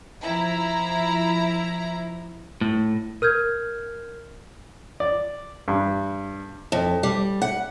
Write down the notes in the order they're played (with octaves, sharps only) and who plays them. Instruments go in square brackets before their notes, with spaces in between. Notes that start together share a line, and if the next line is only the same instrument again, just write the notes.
[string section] F3 E4 A#5
[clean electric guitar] A2
[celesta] A#4 F6 G6 G#6
[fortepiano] D5
G2
[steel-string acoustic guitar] F2
G3
F#5